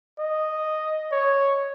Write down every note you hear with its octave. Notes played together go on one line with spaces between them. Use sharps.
D#5
C#5